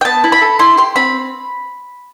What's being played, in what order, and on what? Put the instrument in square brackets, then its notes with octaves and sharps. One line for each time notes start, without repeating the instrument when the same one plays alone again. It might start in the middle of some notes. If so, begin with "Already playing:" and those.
[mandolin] G5
B3 A5
E4
B5
A4
E4 C6
G4 C6
C4 B5